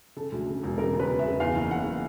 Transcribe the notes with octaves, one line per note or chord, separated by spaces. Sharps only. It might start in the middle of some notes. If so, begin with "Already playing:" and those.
C#3 A4
D2
C#3
E1
C#3 A#4
C#3
B4
C#3
E5
C#3
E2 F5
F#1
E2 F#5